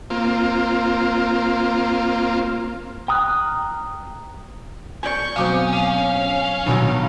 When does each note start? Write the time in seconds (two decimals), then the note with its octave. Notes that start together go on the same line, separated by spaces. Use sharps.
0.10 A#3 C4 F4
3.08 G5 A#5 D#6 F6 F#6
5.03 D5 G#5 C#6 G6
5.36 B2 F#3 C4 C#4 F5 D6 D#6
5.73 F5 D#7
6.66 G2 B2 D#3 F#3